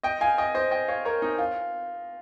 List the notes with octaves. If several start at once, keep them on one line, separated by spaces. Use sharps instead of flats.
D#5 G5
F5 G#5
D#5 G5
C5 D#5
D#5 G5
C#5 F5
A#4 C#5
D#4
F4